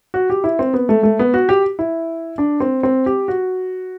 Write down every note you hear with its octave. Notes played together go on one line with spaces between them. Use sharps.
F#4
G4
E4
C4
B3
A3
A3
B3
F#4
G4
E4
D4
C4
C4
G4
F#4